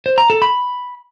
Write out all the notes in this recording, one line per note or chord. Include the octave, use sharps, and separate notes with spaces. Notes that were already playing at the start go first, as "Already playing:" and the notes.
C5
A#5
A4
B5